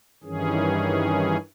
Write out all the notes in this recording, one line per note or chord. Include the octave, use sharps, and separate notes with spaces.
G2 D#3 E3 C#4 G#4